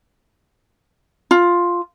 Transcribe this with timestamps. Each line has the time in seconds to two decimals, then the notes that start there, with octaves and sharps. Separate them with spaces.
1.31 F4